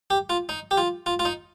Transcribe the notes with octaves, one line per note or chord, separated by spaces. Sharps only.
G4
F4
D#4
G4
F4
F4
F4
D#4